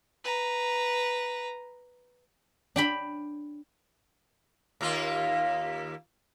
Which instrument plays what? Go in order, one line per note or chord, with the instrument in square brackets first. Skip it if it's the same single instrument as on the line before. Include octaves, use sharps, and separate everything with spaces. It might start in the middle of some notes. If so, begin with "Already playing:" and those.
[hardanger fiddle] B4 A#5
[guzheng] D4 G5 B5
[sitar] D#2 A#3 F4